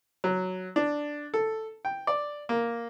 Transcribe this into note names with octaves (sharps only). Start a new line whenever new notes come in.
F#3
D4
A4
G5
D5
A#3